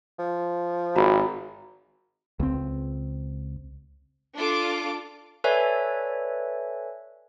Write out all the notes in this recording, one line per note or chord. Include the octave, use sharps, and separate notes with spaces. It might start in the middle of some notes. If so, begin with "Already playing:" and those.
F3
G#1 F#4 A#5 B5
C#2 C4
D4 F4 A4 D6
A4 B4 C#5 D5 E5 G#5